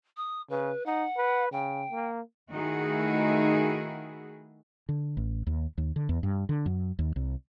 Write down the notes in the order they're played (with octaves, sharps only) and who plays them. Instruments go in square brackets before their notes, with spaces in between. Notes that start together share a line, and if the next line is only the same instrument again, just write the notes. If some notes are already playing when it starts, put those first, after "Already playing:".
[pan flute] D#6
[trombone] C#3 [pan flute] B4
[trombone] D#4 [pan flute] F#5
[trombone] B4
[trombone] C#3 [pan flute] G5
[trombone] A#3
[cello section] D#3 A3 D#4 E4 F#4 G#4
[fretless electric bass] D3
A1
D#2
D#2
D3
E2
G2
D3
F#2
D#2
C2